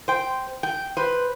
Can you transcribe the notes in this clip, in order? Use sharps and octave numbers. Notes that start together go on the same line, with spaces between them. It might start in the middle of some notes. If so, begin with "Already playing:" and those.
C5 G5
G5
B4 C5